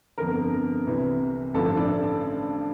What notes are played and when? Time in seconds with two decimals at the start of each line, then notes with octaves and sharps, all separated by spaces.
0.18 G1 F2 D3 A#4
0.86 C2 C3 E3
1.54 A1 G2 D3 F3 A4
1.77 D4